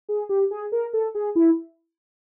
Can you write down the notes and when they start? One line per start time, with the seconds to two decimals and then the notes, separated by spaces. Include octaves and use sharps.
0.09 G#4
0.29 G4
0.51 G#4
0.72 A#4
0.93 A4
1.15 G#4
1.35 E4